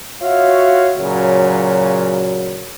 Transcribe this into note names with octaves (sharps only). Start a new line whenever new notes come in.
F4 F#4 C#5 E5 F5
A#2 C#3 F#3